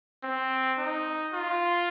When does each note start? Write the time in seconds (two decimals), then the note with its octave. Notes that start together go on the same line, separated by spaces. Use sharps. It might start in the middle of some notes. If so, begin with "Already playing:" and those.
0.23 C4
0.78 D#4
1.34 F4